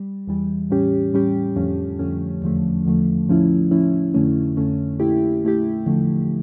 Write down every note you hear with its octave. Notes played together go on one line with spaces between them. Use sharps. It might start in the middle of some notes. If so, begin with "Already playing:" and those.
Already playing: G3
E2 E3 G3
A2 G3 C#4 G4
A2 G3 C#4 G4
F2 D3 F3 A3 C#4
F2 D3 F3 A3 C#4
E2 D3 F3 A3
E2 D3 F3 A3
A2 F3 C#4 E4
A2 F3 C#4 E4
F2 D3 A3 C#4
F2 D3 A3 C#4
A#2 A3 E4 G4
A#2 A3 E4 G4
E2 D3 F3 A3